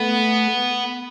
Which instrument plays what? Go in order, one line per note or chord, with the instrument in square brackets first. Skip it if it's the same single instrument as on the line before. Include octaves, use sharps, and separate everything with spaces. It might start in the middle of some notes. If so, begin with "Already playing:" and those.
Already playing: [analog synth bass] A3 [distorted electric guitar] B3